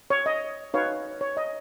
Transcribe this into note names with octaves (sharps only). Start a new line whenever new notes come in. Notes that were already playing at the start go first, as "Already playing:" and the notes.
C#5
D#5
D#4 F#4 B4 C#5 F5
C#5
D#5